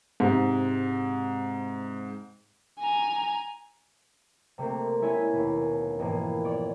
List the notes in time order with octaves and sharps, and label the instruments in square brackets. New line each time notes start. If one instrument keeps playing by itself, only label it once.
[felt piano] G#2 C3
[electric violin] G#5 A#5
[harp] C3 A3 A#3 C4
G#3 C#4 E4 C#5 E5 G#5
D#2 B2
F2 G#2 B2 E3 A#3
C#5 D5